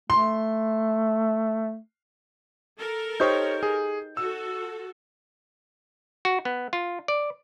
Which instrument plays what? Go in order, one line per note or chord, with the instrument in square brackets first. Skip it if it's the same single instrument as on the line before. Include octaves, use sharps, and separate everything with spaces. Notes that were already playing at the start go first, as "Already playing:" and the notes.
[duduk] A3 [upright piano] C6
[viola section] A4 A#4
[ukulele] D#4 G4 C5 [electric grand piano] C#5 C#6 G6
[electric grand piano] G#4
[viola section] F#4 A4 [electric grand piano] E6
[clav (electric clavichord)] F#4
B3
F4
D5